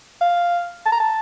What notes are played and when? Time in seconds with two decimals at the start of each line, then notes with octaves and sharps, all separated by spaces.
0.21 F5
0.86 A5
0.92 A#5
1.00 A5